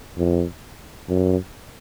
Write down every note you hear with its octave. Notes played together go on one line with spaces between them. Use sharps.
F2
F#2